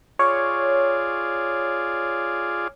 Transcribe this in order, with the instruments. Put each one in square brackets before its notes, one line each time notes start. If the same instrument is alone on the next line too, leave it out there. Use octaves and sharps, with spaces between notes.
[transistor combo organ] F4 G#4 D5 [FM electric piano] C#5